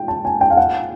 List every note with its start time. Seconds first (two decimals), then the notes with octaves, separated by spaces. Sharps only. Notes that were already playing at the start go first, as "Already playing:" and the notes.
Already playing: G5
0.08 A5
0.25 G#5
0.41 G5
0.50 F5
0.57 F#5